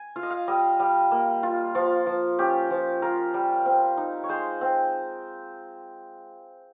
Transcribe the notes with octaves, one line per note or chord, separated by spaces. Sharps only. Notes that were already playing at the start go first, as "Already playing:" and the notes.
Already playing: G#5
F4 F5
D#5
F5
G3 D#5
G3
A#3
F4
F3 F4
F3
C#4 G4
F3
F4 A#4
G3
C4
D#4
C#5
G#3 C5
C4